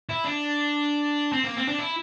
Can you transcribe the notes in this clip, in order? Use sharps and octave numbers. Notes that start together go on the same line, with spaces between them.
E4
D4
C4
A#3
C4
D4
E4